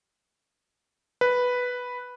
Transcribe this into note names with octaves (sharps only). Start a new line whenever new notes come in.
B4